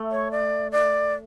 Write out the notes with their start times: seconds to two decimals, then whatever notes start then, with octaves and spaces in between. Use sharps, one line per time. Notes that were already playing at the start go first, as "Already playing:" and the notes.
Already playing: A3
0.11 C#5
0.31 D5
0.72 D5